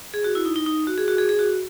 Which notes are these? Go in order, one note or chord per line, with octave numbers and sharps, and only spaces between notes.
G#4
F#4
E4
D#4
D#4
D#4
F#4
G#4
F#4
G#4
G#4
F#4